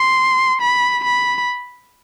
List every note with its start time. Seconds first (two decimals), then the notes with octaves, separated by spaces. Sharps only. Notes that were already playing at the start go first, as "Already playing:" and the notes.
Already playing: C6
0.61 B5
1.04 B5